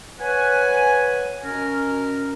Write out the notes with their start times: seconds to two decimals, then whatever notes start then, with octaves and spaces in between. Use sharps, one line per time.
0.20 B4 C#5 F#5 G#5
1.44 B2 C#4 A#4